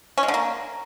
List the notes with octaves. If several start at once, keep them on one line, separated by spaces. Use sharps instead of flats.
C#4
G#3
D3
A#3